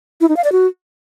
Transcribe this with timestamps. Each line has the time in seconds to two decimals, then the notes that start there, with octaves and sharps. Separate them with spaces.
0.21 E4
0.29 D#4
0.36 F5
0.44 D5
0.52 F#4